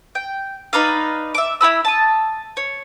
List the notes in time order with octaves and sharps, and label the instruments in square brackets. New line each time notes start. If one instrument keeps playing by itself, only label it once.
[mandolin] G5
D#4 B4 D5 F5
E5 D6
E4 G4 B5 E6
A5 D#6
C#5